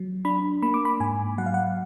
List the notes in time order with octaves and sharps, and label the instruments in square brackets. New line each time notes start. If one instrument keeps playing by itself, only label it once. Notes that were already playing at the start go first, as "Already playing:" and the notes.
Already playing: [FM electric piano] F#3
D4 B5
A#3 B5
D6
B5
G#2 G#5
F#3 F#5
F5
F#5